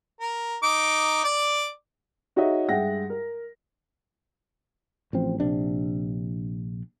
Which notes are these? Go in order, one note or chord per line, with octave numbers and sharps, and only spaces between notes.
A#4
D#4 D6
D5 D6
D#4 F#4 G#4 C#5 D#5 E5
G2 G#3 E5 F#5 G5 A#6
A#4
A1 F3 C4
A#1 C3 D4